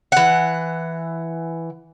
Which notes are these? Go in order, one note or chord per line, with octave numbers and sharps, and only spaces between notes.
E3 F#5